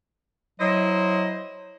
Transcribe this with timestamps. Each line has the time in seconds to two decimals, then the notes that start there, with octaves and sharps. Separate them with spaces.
0.60 F#3 E4 C5 D#5